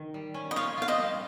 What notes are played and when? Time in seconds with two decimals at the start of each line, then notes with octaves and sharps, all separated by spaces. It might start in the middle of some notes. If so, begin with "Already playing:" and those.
Already playing: D#3
0.14 G3
0.34 C#4
0.51 D#5
0.56 F4 C#5 F5
0.78 F4 F5
0.88 C5 D#5
0.99 G3